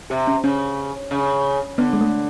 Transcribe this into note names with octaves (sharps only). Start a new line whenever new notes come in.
C3 G4
C#4
C#3 C#4
C#3
D3 B3
G#3
A3